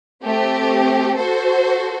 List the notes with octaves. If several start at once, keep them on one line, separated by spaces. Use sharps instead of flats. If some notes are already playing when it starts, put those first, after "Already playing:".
A3 C4 G4
F#4 A4 C5